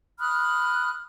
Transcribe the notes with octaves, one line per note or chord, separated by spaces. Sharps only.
B5 D#6 F6 F#6